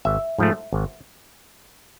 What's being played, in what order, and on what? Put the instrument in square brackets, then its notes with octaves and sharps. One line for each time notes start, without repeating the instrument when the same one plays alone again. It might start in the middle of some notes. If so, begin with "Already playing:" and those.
[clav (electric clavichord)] G#1 E5
G#2 F3 A3
G#1